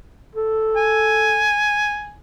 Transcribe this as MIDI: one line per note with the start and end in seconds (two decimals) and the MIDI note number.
0.35 1.49 69
0.76 2.15 80